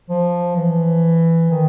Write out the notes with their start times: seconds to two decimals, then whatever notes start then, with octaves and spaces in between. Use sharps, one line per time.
0.10 F3
0.57 E3
1.51 D#3